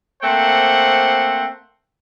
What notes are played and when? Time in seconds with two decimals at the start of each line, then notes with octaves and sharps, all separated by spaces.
0.23 A3 A#3 C4 C5 F#5